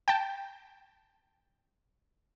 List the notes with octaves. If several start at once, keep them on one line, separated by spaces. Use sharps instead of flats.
G5 A5